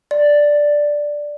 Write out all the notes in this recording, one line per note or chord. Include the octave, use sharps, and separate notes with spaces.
D5